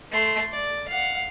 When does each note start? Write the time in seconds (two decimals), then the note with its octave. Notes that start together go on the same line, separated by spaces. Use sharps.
0.12 A3 C6
0.51 D5
0.88 F5 F#5